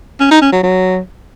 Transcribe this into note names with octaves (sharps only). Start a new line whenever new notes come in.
C#4
D#4
C#4
F#3
F#3